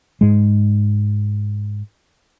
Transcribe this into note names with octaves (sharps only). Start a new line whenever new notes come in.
G#2 G#3